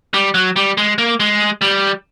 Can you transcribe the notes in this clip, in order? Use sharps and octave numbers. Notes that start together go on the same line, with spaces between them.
G3
F#3
G3
G#3
A#3
G#3
G3